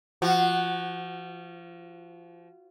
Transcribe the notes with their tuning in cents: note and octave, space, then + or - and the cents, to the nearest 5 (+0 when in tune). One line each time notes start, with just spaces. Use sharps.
F3 -25 F#4 +0